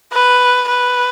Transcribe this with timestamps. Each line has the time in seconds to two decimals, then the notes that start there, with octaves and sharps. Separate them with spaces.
0.12 B4
0.68 B4